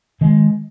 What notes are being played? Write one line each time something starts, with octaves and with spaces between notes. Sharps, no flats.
D#3 G#3